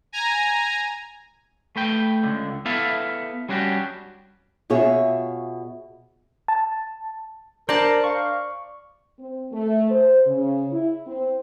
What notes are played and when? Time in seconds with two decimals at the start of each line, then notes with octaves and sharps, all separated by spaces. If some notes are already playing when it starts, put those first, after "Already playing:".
0.12 G#5 A#5
1.76 A3 B4 G5
2.23 C#2 D3
2.65 B3 E4 A4 B4 E5 F5
3.49 G3 C#4 D4 F#4 G4
4.70 B2 F4 G#4 C#5 E5
6.48 A5
7.69 D4 A#4 C5 D5 A5 A#5
8.04 F5 C#6
9.19 C4
9.53 A3
9.90 C5
10.26 C#3
10.72 E4
11.06 C4